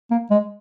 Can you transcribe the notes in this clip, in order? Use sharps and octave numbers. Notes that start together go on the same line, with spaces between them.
A#3
G#3